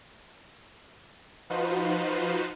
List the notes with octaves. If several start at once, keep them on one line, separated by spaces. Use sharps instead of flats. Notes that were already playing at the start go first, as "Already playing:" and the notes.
F3 D#4 F4 F#4 B4 C5